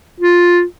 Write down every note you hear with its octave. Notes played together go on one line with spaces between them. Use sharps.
F4